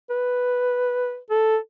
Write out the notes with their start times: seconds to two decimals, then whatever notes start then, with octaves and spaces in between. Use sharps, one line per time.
0.10 B4
1.30 A4